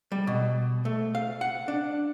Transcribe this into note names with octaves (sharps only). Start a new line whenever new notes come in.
G3
B2
A3
F5
F#5
D4